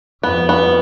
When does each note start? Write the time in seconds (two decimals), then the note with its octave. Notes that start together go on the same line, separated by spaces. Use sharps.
0.23 F2 B3
0.49 B3